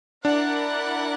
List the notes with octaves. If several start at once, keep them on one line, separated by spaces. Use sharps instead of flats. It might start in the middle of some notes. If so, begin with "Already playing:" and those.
D4 E4 A#4 D5 F#5